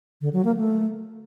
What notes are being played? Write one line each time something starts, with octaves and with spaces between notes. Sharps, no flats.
D3
F#3
A#3
A3